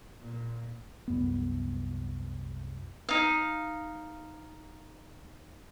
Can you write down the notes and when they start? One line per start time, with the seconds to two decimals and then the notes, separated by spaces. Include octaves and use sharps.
0.20 A#2
1.08 C2 F#2 B3
3.09 D#4 F5